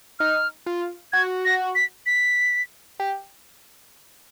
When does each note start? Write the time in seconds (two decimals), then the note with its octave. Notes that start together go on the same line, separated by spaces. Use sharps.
0.19 D#4 F6
0.66 F4
1.13 F#4 G#6
1.45 A#6
1.75 B6
2.06 B6
3.00 G4